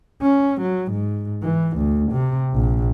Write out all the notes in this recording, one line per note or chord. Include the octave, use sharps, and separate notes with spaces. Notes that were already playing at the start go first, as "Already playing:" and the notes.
C#4
F#3
G#2
E3
D2
C3
A#1